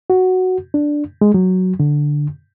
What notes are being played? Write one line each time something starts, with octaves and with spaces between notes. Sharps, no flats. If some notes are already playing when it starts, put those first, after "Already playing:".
F#4
D4
G#3
F#3
D3